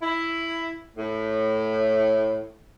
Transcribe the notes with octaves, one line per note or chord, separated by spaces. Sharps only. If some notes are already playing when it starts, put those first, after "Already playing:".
E4
A2